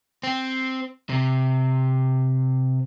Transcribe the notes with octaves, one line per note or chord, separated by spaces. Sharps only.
C4
C3